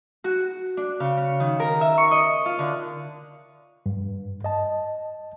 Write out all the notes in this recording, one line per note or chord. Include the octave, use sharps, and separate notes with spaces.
F#4
D4
C#3
C#4
D#3
A#4
E5
C#6
D#5
F4
D3
G2
D#5 A5